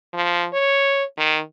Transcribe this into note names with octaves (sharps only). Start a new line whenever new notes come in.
F3
C#5
D#3